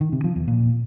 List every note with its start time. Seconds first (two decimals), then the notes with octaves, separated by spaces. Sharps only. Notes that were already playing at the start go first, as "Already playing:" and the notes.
0.01 D#3
0.12 C3
0.24 F3
0.36 E2
0.48 A#2